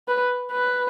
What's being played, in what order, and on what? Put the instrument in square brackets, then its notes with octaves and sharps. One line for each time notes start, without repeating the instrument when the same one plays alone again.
[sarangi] B4
B4